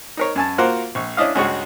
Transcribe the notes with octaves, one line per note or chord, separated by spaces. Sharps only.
D#4 A#4 C#5
F#2 G#5 A5
A#3 F4 F#4 A#4 C5 F#5
A#1 C#6
C#4 D4 E4 D#5 F5
C#2 G2 G#3 C#4 F#4 C#6